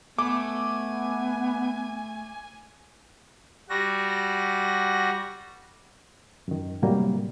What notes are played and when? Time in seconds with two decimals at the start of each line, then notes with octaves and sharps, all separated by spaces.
0.19 A3 B3 G#5 D6
3.69 G3 F#4 A#6
6.48 F#2 D#3
6.82 A2 C3 D#3 F#3 G3 A#3